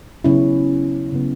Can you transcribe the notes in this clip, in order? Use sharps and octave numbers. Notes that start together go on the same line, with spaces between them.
C#3 F#3 B3 C#4 E4
C#3 F#3 B3